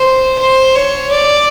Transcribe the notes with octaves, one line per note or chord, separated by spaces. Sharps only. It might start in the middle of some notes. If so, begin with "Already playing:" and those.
Already playing: C5
C5
C#5
D5